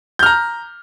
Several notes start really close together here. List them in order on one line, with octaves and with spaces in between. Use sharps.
G6 F6 A#5